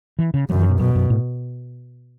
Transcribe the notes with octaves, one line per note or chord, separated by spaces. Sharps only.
E3
C#3
F#2 C#3 F#3
E3
B2
F#2 B2
F#2
A2